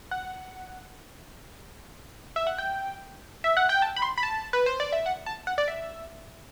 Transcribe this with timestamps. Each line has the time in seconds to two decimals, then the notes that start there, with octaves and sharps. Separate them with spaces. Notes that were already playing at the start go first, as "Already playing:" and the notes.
0.11 F#5
2.36 E5
2.47 F#5
2.58 G5
3.44 E5
3.57 F#5
3.69 G5
3.82 A5
3.96 B5
4.02 C6
4.18 B5
4.23 A5
4.53 B4
4.66 C5
4.80 D5
4.93 E5
5.06 F#5
5.26 A5
5.47 F#5
5.58 D5
5.68 E5